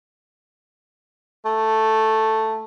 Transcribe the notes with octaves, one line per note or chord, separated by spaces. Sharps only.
A3